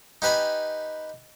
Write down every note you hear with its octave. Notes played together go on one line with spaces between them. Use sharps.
D#4 G4 B4 G#5 B5